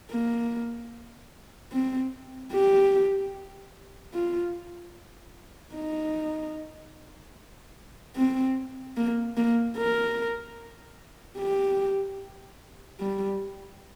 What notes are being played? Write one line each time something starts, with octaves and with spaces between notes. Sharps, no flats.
A#3
C4
G4
F4
D#4
C4
A#3
A#3
A#4
G4
G3